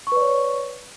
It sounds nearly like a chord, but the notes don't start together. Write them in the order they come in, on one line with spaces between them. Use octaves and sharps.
C#6 B4 D5 C#5